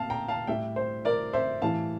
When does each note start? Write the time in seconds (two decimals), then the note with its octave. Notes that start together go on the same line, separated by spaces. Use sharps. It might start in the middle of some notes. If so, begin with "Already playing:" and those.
Already playing: A#2 A3 F5 A5
0.10 G5 A#5
0.28 F5 A5
0.47 A2 G3 E5 G5
0.76 C5
1.05 A#4 D5
1.33 C5 E5
1.62 A2 E3 G3 F5 A5